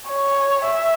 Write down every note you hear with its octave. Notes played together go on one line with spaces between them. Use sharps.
C#5
E5